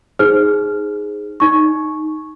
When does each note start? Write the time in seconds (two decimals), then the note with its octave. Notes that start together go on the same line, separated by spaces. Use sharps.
0.19 D#4 G#4 C5 F6
1.40 D#4 C#6